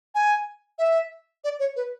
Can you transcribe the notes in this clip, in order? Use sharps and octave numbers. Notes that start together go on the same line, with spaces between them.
G#5
E5
D5
C#5
B4